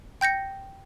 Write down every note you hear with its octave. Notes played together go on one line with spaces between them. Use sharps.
G5 G6 A#6 C#7